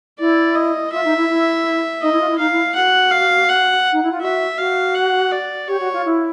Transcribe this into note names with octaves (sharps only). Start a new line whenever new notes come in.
E4 D5
D#5
F4 E5
D#4
E4
E4
D#4 D#5
E4
F4
E4
D#4 F5
E4
F#4 F#5
F5
F#5
D#4
E4
F4
F#4 E5
F#4 F5
F#5
D5
G4 C#5
F#4
F4
E4